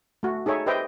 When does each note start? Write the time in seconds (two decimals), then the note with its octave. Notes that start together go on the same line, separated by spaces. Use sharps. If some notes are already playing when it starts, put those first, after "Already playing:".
0.23 A3 F#4
0.46 D#4 G#4 A4 C#5 E5
0.66 G4 B4 C5 D#5 E5 G5